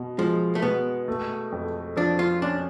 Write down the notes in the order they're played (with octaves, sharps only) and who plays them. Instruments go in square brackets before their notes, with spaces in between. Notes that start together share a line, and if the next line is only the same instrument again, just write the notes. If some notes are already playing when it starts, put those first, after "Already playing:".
Already playing: [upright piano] B2
[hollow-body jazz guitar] F3 [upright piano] G#3
[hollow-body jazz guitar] A3
[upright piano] B2 [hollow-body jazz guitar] B3
[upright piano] A3
F2
[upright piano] F3 [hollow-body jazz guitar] D4
[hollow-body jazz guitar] F4
[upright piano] C#4 [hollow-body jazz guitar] D4